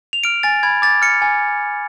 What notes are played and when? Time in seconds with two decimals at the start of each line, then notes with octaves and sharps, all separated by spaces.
0.13 F7
0.24 F6 D7
0.43 G#5 A6
0.63 B5 G#6
0.82 D6 A6
1.02 F6 C#7
1.22 G#5